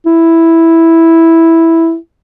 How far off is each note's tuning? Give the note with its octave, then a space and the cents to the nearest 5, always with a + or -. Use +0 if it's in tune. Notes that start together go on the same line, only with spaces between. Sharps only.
E4 -5